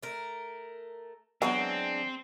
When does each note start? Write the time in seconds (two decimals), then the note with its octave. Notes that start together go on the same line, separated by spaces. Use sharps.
0.03 A3 A#4
1.42 E3 F#3 G#3 B3 C4 D4